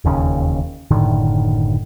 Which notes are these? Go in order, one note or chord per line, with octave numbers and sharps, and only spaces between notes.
E1 D#2 C#3
F#1 A2 D3 D#3